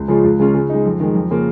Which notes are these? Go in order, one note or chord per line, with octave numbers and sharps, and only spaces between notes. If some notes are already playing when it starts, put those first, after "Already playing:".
Already playing: C#2
C#3 F3 G#3 F4
C#2
C#3 G#3 C#4 F4
C#3
G#3 D#4
F2
D#3 G#3
F2
C#3 A#3 F4